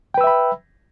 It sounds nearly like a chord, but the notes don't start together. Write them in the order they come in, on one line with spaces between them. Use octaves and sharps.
G5 B4 E6 E5 B5